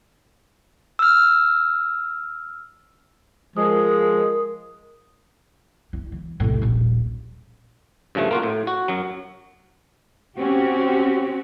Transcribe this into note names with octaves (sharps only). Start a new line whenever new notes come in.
E6 F6
F3 G#3 A#4 D#6
E4
E3
C2 A2
D#1 A#1
G2 C#3 F3 A3
A#3 F4 F#4
A2
F#4
F#2 F#3
C4 C#4 F#4 G4